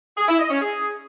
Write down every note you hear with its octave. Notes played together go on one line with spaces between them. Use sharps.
G#4
E4
D#5
C#4
G#4